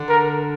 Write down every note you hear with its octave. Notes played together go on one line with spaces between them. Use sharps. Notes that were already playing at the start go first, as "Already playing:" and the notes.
Already playing: D3
A#4